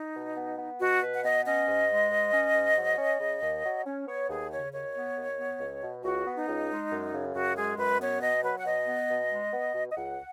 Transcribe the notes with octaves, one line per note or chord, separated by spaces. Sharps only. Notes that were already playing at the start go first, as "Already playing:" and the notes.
Already playing: D#4
B2
B3
B3
B2 F#4
B2 B4
F#5
B3 D#5
C#4 D#5
G#2
G#3
G#2
C#4
G#2
F#3
C#4
C#3
D#2
F#3
C#4
B3 C#5
D#2 G#4
C#3 C#5
D#2 C#5
B3
D#2
B3
C#2
B2
C#2 F#4
B3
D#4
C#2
G#3
F#2
C#3
F#2 F#4
G#3 G#4
F#2 B4
B3 C#5
B2 D#5
F#3 B4
F#5
B2 D#5
B3
B2
G#3
B3
B2
D#5
C#2 F#5